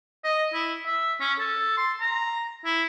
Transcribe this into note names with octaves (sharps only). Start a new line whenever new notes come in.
D#5
E4
E5
C#4
A4
C6
A#5
E4